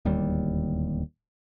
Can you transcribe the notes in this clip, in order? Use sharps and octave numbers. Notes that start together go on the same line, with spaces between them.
D1 D#2 G3